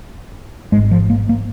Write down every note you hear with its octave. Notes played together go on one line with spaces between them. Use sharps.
G#1 G#2 G#3
F3
A#3
A#3